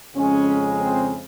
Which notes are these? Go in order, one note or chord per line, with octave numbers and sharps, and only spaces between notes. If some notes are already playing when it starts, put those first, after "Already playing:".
F2 C#3 G#3 C#4
C4